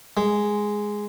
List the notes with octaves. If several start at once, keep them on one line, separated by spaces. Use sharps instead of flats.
G#3